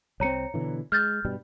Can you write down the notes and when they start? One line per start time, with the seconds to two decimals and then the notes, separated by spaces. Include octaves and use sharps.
0.20 C2 G3 C4 C#5 A#5 C#7
0.54 B2 D3 E3
0.92 G#3 F6 G6 A6
1.25 G2 B2 G3